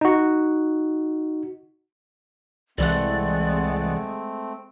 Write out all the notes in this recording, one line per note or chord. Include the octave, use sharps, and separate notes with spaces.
D#4 F#4
C2 E3 G#3 A3 C4 D5 F#5